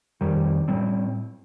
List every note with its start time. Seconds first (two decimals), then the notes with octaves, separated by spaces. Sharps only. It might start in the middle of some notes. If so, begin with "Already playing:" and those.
0.21 F2 D#3 G3
0.68 A2 G3 C4